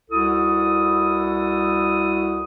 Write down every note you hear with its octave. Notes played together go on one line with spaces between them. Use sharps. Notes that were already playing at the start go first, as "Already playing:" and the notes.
C2 E4 F#4 A4 D#6